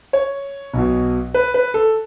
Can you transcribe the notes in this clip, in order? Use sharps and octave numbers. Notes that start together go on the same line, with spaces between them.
C#5
B1 B2
B4
B4
A4